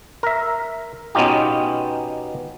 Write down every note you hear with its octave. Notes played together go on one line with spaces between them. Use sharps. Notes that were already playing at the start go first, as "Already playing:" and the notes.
A#4 E5
B2 B3 C#4 D#4 F4 G4